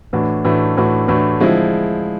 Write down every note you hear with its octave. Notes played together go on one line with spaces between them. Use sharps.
A2 E3 A3 D4 F#4
A2 E3 A3 D4 F#4
A2 E3 A3 D4 F#4
A2 E3 A3 D4 F#4
D3 F3 G#3 C4 E4